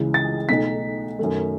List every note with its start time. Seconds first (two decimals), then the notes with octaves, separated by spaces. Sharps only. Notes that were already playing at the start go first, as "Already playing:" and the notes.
Already playing: C#2 C#3 E3
0.14 A6
0.49 B1 B2 A3 D#4 B6
1.19 F#2 D#3 A3